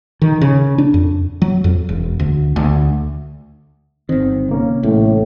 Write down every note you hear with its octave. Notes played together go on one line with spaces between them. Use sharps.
D#3
C#3
D4
F2
F#3
F2
E1
D2
D2
G1 D#3 C4
C3 A#3 C#4
A1 A2